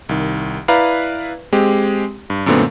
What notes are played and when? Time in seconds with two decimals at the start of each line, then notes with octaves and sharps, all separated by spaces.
0.09 C2 D#3
0.68 E4 B4 D5 F5 A#5 B5
1.52 G#3 C4 G4
2.30 G2
2.46 F#2 A#2 D3 A3 B3 C4